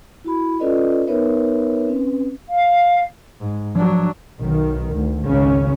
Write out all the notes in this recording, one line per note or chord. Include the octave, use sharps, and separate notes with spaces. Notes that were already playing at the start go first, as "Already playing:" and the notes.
E4 F#4 B5
C#4 F4 A4 B4 D5 D#5
B3 D#4 A#4 B4 C#5 E5
C4 C#4 B4
F5
G#2
F3 F#3 D4
B1 D#3
D2
G#1 C#2 C#3 C#4